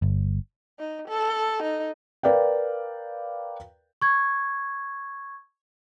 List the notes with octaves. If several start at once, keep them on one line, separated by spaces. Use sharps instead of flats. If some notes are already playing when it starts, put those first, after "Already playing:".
G1
D#4
A4
D#4
A#4 B4 D5 F5 G5
C#6 G#6